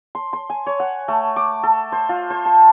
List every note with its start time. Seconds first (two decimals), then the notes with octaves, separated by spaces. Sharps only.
0.15 C6
0.33 C6
0.50 G#5
0.67 C#5
0.80 F#5
1.08 A3
1.36 D6
1.63 A4
1.92 C5
2.09 F4
2.30 C5
2.45 A5